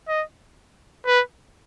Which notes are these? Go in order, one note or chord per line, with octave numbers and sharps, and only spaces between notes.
D#5
B4